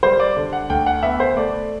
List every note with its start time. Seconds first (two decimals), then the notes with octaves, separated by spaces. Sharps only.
0.03 G3 C5
0.20 D5
0.36 D3
0.53 F#5
0.70 D2 G5
0.86 F#5
1.03 B3 E5
1.20 C5
1.36 A3 D5